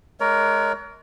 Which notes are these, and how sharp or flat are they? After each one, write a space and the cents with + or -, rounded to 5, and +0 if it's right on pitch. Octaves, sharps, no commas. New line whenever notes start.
G#3 +30 A#4 +0 C#5 +40